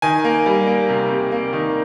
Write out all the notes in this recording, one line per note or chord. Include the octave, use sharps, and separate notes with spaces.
D#3 G#5
A#3
G3
A#3
C3
C3
A#3
D#3